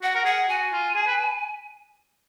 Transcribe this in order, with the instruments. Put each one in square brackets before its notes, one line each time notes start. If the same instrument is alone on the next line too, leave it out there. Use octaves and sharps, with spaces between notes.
[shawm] F#4 [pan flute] F#5
[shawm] A#4
[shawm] G#4 [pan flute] F#5
[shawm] F#4 [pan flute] G#5
[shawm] F4
G#4
B4